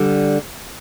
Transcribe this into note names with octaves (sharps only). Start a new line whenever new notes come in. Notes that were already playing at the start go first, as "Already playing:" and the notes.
Already playing: D3 G3